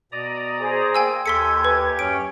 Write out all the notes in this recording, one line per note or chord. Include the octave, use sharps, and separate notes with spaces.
B2 D5 A#5 D#6
G#4 C5
A#3 G5 G#5 E6
D#2 G4 A4 G#5 C6 G#6 B6 C#7
B4
F#2 C#4 C#5 D7